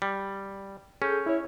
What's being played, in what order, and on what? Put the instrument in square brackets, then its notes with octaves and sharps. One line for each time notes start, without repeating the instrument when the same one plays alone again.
[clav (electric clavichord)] G3
[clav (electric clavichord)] C#4 [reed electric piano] G#4 A4 G6
[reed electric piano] E4 C#5